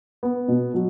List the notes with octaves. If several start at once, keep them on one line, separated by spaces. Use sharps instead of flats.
B3
B2
F#3